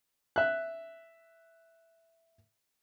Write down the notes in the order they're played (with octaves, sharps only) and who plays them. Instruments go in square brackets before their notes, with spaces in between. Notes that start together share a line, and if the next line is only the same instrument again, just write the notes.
[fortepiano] E5 F#6